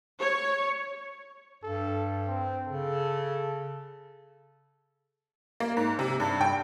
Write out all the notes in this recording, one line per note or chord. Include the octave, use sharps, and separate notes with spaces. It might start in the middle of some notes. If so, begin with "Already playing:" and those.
C#5
G2 A4
C4
C#3 A4
A#3
G#2
C3
G2
G5